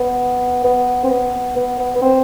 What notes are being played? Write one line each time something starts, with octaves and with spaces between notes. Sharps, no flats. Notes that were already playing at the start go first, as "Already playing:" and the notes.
Already playing: B3
B3
C4
B3
B3
B3
B3
C4